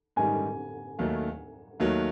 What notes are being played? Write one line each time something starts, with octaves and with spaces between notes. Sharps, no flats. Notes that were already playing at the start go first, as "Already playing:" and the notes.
G#2 D#3 G3 G#5
D#2 D#3 F#3 A3
D#2 D#3 F#3 A3